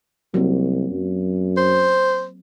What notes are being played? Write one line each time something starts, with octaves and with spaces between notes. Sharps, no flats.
C2 F#3 A#3 C4
F#2
C5